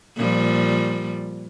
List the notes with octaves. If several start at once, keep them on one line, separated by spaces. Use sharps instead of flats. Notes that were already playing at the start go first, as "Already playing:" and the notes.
A#2 F3 G3